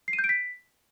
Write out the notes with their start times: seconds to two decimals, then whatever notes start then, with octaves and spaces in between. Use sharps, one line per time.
0.08 C7
0.13 D#7
0.19 G6
0.24 D7
0.29 B6